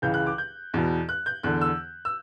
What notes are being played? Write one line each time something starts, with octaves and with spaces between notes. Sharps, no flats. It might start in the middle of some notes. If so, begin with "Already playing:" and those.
C#2 C#3 E3 G6
F#6
D6
G6
E2 B2
F#6
G6
E2 D3 F#6
E6
E6